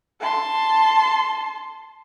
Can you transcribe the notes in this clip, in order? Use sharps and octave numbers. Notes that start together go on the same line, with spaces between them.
A5 C6